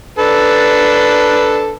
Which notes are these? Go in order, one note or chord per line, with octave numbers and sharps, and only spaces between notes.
D4 A4 B4